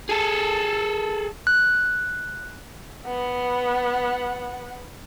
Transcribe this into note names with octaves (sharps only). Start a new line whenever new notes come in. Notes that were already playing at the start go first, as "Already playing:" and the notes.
G#4 A4
F#6
B3 F#5